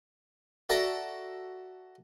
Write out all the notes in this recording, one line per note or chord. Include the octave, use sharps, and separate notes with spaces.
F#4 A4 D5 E5 A5 A#5